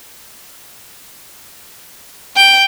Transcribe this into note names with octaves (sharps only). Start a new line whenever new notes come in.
G5